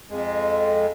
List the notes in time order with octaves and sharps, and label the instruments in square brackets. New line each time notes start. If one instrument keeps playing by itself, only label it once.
[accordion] F2 G#3